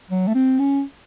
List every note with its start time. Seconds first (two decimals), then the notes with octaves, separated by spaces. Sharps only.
0.11 F#3
0.28 A3
0.35 C4
0.60 C#4